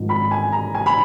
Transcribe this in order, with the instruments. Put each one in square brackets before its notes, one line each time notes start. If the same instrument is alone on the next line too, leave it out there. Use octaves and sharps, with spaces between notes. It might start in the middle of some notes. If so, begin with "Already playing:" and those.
Already playing: [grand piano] G#1 G#2 F3
B5
G#5
A#5
G#5
B5